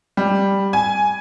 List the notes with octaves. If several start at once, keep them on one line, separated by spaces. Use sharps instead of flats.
G3
G#5